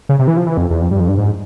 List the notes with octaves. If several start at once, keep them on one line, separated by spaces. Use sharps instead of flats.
C#3
C3
E3
F3
E3
F2
E2
F2
G2
F2
G2
G#2